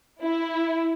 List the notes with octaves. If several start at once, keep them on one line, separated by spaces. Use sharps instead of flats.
E4